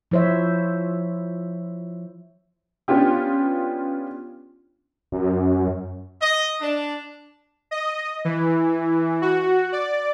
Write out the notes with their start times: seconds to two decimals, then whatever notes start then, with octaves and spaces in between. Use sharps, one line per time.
0.11 F3 E4 C5 C#5 E5
2.88 B3 C#4 D4 F4 G4
5.12 F#2
6.22 D#5
6.61 D4
7.71 D#5
8.25 E3
9.22 F#4
9.72 D5